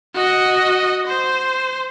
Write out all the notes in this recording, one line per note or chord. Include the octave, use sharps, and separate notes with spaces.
F#4 D#5
C5